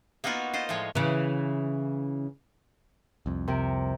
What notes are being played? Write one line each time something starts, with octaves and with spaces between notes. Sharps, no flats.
A#3 B3 D#4 F4 F#4 A#4
F4 C5 D#5
A2 F3 G#3 C#5
C#3 E3
C2 F2
C3 C4 A#4